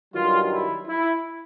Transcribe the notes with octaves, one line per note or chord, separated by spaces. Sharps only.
G2 D#3 F#3 F4
E4
E4